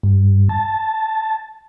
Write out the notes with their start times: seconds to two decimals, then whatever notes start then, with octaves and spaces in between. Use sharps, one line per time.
0.03 G2
0.49 A5